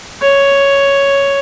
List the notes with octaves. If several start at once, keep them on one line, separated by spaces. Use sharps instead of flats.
C#5